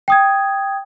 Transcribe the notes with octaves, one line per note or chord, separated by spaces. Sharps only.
G5 D#6 G#6